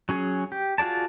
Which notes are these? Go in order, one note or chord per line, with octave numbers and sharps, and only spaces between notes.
F#3 C#4 G#4
G4
F4 F#4 G#4 D5 A5